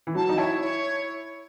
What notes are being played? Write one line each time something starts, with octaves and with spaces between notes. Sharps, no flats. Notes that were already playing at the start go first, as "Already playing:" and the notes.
E3
F#3 A5
D#4
E4 C#5
C#5